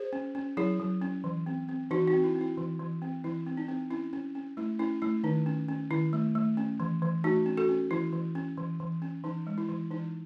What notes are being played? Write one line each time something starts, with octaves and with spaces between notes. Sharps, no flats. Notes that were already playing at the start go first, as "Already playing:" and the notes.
Already playing: G#4 C5
C#4
C#4
F#3 E4 G#4
F#3
C#4
E3
C4
C4
E3 D#4 F#4
D#4 F#4
C4
E4
C4
E4
E3
E3
C4
E3 E4
C4
D#4
C4
C#4 E4
C#4
C#4
A3 E4
C#4 E4
A3 E4
D#3 D#4
C#4
C#4
D#3 E4
A3
A3
C#4
E3
E3
A3 D#4 F#4
C#4
F#4 A4
C#4
E3 E4
E3
C#4
E3
E3
C#4
E3 D#4
G#3
E4
E3
E3 D#4